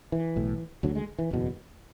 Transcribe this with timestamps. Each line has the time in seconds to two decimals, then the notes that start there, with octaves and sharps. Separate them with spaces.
0.12 E3
0.36 B1 A2
0.83 D2 D3 F#3
0.95 G#3
1.19 E3
1.31 F#1 E2 B2